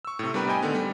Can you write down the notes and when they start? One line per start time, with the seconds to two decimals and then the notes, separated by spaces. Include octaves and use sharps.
0.05 C#6 E6
0.19 A2 C3
0.34 G3 B3 D4 A#4 B4
0.47 G4 C5 D#5 G5 G#5
0.62 D3 D#3 A3 B3
0.75 G3